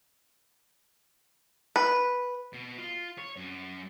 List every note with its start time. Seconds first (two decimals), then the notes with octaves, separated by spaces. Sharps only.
1.76 B4
2.53 B2
2.78 F4
3.18 C#5
3.36 F#2